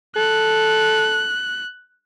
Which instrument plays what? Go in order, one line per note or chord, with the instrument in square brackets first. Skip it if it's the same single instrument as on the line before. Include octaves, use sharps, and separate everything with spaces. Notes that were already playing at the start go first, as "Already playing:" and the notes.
[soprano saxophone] A4 [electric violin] F#6